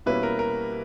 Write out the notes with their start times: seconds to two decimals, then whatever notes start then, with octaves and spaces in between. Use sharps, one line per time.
0.06 B2 G3 A#3 C#4 E4 B4
0.23 A#4
0.39 A#4